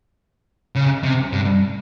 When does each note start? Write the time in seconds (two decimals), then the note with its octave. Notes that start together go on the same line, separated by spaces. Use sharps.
0.75 C#3
1.04 C3
1.32 G2